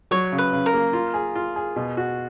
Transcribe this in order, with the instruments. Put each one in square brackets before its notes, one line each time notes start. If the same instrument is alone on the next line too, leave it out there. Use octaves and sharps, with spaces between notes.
[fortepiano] F#3 [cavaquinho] C#5
[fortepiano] C#3
[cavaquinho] B4
[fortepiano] C#3
[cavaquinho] A#4
[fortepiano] A#3
F4
G#4
F4
G#4
B2
F#4